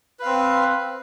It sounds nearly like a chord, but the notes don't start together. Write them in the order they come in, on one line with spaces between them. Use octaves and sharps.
B4 F5 C4